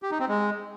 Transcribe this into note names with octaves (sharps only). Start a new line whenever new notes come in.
G4
D#4
C4
G#3